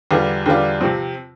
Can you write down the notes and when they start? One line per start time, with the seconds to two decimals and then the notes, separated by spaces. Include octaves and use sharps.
0.11 E2 D3 G3 D4 F4
0.46 E2 D3 G3 D4 F4
0.81 C3 F3 C4